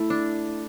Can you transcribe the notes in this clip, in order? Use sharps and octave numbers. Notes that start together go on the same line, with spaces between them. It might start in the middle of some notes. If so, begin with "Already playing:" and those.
Already playing: A3 E4
D4